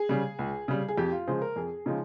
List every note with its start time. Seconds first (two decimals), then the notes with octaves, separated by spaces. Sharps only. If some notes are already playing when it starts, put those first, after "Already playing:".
Already playing: G#4
0.09 C#3 G3
0.39 C#2
0.68 C#3 G3
0.88 G#4
0.97 F2 G4
1.12 F4
1.27 C#3 F3 G#3 C5
1.42 A#4
1.56 F2 G#4
1.86 C#3 F3 G#3 D#4